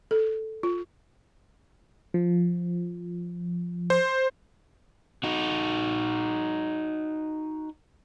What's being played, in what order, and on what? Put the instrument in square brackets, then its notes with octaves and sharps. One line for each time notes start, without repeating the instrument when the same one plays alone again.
[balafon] A4
F4
[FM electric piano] F3
[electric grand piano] C5
[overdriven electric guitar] D#4 F#4